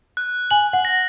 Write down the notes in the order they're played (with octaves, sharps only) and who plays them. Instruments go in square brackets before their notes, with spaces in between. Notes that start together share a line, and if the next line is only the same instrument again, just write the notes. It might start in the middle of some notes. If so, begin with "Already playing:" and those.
[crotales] F#6
[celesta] G#5 [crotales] F#7
[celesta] F#5
[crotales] A#6